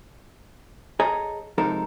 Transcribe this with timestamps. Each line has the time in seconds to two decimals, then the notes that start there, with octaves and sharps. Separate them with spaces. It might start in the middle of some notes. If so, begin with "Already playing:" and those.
1.00 G#4 A4 C#5 D#5 G#5 A#5
1.58 C3 F3 G#3 D#4 A4 A#4